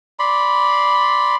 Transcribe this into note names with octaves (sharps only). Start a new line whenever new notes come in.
D5 B5 C6